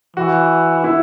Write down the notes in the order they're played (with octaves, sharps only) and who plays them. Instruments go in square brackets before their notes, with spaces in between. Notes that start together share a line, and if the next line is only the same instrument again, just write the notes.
[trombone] E3 [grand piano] F#4
[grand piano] E4